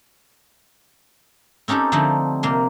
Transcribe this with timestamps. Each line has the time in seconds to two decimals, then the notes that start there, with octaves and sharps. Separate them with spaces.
1.68 C4 C#4 D#4 G4 A4
1.92 D3 F3 A3 C4 D#4
2.43 C3 A#3 C6